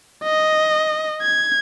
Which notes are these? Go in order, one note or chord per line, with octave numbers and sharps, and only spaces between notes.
D#5
G#6